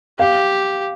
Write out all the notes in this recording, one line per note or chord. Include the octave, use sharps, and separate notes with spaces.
G4 F5